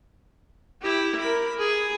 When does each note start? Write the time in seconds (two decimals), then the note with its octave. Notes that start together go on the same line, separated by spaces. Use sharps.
0.82 E4 G4
1.20 A#4 B5
1.58 G#4